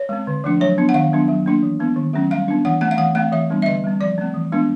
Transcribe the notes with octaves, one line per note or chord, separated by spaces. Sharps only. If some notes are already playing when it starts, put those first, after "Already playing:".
Already playing: C#5
G#3 C4
D3
F3 A3 D4
F#3 C#5
B3 D4
F#5
D#3 F5
F#3 B3 D4
F#3
A#3 D4
E3
G#3 B3 D4
D#3
F#3 A3 C#4
G3 F5
B3 D4
E3 F#5
A3 C4 F#5
F5
E3 F#5
A3 C4 F5
E3 E5
G3 B3 D4
E5
D3 D#5
G3 C4
F3 D5
A3 C4
E3
G#3 B3 D4